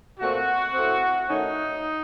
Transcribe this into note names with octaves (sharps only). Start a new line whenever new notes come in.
A#2 A3 C4 F#4
A2 A3 C4
D#3 A3 C#4 D#4